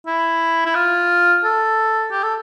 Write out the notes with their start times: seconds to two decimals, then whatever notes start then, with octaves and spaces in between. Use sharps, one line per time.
0.06 E4
0.66 E4
0.75 F4
1.44 A4
2.12 G4
2.23 A4